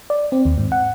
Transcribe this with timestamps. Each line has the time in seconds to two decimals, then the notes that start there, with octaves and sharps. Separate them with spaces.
0.10 D5
0.32 C4
0.46 D#2
0.58 G#2
0.72 F#5